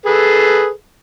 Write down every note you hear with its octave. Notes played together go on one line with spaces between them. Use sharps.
G#4 A4 B4